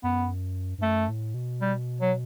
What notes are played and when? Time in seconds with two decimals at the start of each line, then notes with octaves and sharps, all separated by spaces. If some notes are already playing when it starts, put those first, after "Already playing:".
0.03 F#2 B3
0.78 G2
0.82 F#2 A3
1.09 A2
1.34 B2
1.61 G3
2.01 F#3